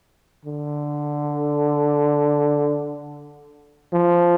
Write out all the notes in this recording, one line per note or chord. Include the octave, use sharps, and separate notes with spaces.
D3
F3